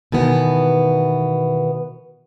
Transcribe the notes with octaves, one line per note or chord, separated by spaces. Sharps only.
B2 D#3 E3 B3